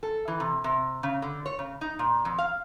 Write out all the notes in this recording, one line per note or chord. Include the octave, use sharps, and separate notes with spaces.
A4
E3
C3
C3
C#3
D3
C#5
C#3
D#4
A#2
F2
F5